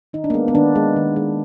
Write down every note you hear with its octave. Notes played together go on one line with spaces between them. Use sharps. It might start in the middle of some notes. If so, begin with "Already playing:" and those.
D#3 D#4
D4
A#3
G#3 B3
B3
D#3 D4
G#3
D#3
G#3